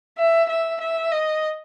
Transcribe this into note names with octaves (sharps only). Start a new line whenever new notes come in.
E5
E5
E5
D#5